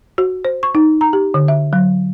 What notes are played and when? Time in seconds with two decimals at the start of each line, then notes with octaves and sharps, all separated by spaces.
0.18 F#4
0.45 C5
0.63 C#6
0.75 D#4
1.01 A#5
1.13 G4
1.34 D3
1.48 E5
1.73 F#3